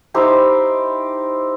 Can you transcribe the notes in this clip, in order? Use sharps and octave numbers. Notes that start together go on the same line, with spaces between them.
D#4 E4 G4 C5